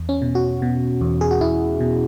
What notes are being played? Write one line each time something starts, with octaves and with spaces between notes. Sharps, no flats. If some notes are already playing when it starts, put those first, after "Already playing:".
Already playing: E2
C#4
B2
F#4
B2
E2
G#4
F#4
E2 E4
B2